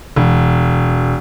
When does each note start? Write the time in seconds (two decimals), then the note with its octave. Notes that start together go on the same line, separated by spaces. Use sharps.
0.16 E1